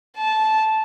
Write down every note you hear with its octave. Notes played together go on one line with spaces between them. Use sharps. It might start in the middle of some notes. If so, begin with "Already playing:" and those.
A5